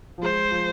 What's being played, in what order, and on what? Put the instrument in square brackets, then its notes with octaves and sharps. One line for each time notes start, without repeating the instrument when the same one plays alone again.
[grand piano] F3
[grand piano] G#3 [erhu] C5
[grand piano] F3